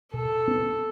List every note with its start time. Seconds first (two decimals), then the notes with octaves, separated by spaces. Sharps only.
0.13 B2 A4
0.48 B3